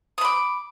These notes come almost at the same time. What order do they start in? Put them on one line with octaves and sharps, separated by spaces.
D#6 B5 D6